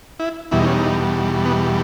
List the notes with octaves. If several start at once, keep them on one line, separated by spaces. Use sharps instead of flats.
E4
E2 B2 G3 E4
D#4
C#4
D#4
B3